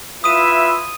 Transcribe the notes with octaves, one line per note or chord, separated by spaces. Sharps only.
E4 F4 B4 E5 D#6 D#7